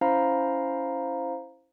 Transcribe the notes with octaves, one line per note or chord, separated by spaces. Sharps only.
C#4 E4 C5 F5 A#5